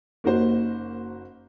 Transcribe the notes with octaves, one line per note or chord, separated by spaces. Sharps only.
F#1 A#3 D#4 F#4 C5